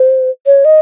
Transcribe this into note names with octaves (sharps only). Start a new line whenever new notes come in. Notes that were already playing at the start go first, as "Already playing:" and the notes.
Already playing: C5
C#5
D#5